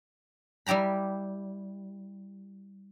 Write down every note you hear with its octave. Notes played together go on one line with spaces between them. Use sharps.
G3 E4 G4 A#5 B5